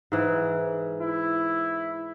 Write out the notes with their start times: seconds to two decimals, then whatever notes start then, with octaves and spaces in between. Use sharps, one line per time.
0.12 G#2 E3
1.01 E4